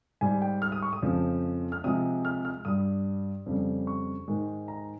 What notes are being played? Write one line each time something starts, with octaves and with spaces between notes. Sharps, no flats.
G#2 G3 G#5
G5
F6
D#6
C#6
D#6
F2 C#3 F3 G#3
F6
C3 F3 G#3 D#6
F6
F6
G2 G3 D#6
F2 C#3 G3
C#6
G#2 D#3 G#3
A#5